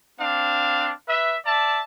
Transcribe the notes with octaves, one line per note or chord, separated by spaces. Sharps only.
C4 D4 F5
B4 E5
D5 E5 A5